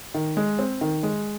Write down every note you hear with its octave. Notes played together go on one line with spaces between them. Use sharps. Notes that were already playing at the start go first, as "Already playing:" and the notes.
D#3
G#3
C4
D#3
G#3